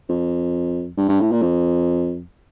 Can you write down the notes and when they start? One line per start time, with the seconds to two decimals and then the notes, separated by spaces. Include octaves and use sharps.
0.09 F2
0.97 G2
1.09 G2
1.20 A2
1.32 A#2
1.42 F2